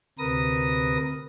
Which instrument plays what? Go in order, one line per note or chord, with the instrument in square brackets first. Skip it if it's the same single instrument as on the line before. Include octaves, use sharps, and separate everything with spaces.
[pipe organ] D2 C3 A#4 B4 D#6 A#6